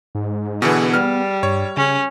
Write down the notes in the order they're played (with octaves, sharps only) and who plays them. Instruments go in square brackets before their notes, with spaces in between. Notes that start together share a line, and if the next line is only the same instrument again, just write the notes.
[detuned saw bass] G#2
[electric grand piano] B2 D3 E3 [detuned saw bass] B3 [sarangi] G#4
[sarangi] G3 [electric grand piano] F6
[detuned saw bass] G2 [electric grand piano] C#5
[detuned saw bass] C#3 [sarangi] C#4